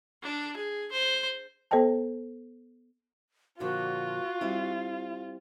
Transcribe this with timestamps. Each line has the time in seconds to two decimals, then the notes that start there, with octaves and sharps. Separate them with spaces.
0.22 D4
0.57 G#4
0.92 C5
1.71 B3 A4 C5 D#5 G5 A5
3.60 A#2 D3 F3 F4 F#4
4.41 G3 C4 E4